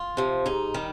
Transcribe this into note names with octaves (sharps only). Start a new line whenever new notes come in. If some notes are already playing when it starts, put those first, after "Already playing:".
Already playing: F4
C3 F3
G#2 D#4
D#3 G3